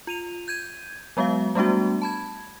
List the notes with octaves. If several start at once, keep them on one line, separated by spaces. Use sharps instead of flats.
F4 D#7 F7
G6 G#6 D#7
F#3 G#3 B3 F#4 F5
G3 A3 B3 D4 F#4
A5 B5 G#6